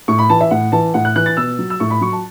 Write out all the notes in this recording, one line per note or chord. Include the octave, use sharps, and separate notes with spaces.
A2 C#6
B5
E3 A5
E5
A2 F#5
E3 A5
A2 F#5
F#6
E3 F#6
A6
B2 E6
F#3
E6
A2 C#6
B5
F#3 C#6
A5